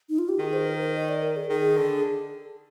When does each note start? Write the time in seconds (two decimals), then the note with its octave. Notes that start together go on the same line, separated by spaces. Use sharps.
0.09 D#4
0.19 F4
0.29 G4
0.39 D#3 G#4
0.53 C5
0.67 A#4
0.81 C5
0.95 D#5
1.09 D5
1.22 A#4
1.36 G#4
1.50 D#3 G#4
1.77 D3